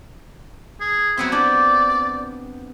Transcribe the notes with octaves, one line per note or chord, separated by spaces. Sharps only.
G#4
F#3 B3 C4 E4
D4 G4 D5